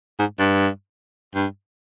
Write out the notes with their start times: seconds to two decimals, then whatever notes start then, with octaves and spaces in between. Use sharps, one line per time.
0.19 G#2
0.39 G2
1.35 G2